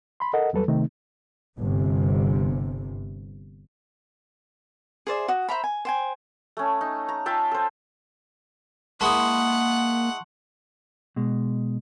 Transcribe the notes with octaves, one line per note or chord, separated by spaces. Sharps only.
B5 C6
A4 A#4 D#5 F#5
E2 F#3 G3 A4 B4
C3 D#3 A3 C4 D#4
G1 C3
G#4 C5 D5 E5
F#4 D#6
C5 E5 A#5 B5
G#5
C5 G5 G#5
A3 C#4
D#4
A#5
F4 E5 G5 A5
A4 C5
G#3 A#3 E4 G#4 F#5 A5 C6 C#6
B2 G#3